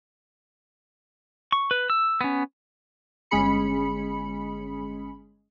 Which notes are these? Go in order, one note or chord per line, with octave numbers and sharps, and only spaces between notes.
C#6
B4
E6
B3 C#4
G1 G#3 C#4 G#4 B5 C#7